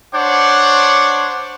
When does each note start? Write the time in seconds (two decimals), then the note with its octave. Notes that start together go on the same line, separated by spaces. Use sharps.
0.13 D4 C5 C#5 F#5 D6